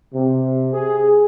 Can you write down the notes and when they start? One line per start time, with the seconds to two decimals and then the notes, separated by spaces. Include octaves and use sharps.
0.13 C3
0.73 G#4